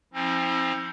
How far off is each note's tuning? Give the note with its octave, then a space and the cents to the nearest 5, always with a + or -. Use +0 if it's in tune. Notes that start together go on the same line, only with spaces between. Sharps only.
F3 +0 C4 +35 E4 -35